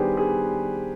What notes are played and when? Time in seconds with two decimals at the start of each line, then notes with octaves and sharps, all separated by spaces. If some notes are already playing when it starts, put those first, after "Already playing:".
Already playing: D#3 G3 B3 D4 G4 G#4 B4 C5
0.17 G#4